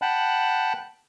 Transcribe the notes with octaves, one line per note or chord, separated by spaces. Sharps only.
F#5 G5 A5 B5 F#6